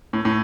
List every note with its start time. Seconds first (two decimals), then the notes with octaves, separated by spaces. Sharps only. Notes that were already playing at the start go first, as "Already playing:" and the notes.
0.13 A2
0.25 A2